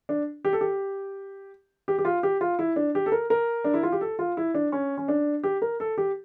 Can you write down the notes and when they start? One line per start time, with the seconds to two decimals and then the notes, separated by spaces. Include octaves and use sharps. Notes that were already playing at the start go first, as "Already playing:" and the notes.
0.09 D4
0.45 G4
0.53 A4
0.61 G4
1.88 G4
1.98 G4
2.05 F4
2.23 G4
2.41 F4
2.59 E4
2.76 D4
2.95 G4
3.06 A4
3.12 A#4
3.30 A#4
3.64 D4
3.74 E4
3.83 F4
3.92 G4
4.01 A4
4.19 F4
4.37 E4
4.54 D4
4.72 C#4
4.97 C#4
5.08 D4
5.44 G4
5.62 A#4
5.80 A4
5.98 G4